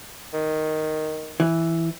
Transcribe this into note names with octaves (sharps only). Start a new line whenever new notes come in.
D#3
E3